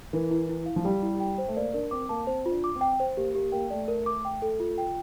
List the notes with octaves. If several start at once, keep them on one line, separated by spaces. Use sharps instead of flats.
E3 A#4
E4
E4
F5
F3
G3 G4
E4
G5
C5
A3
A#3 D5
D4 A#4
C4 D6
A#3 A5
C4 C5
F4
D4
D6
C4
G5
C5
A#3 G4
A#3 G4
A#3 G5
A3 D5
A#4
D6
G5
A4
F4
G5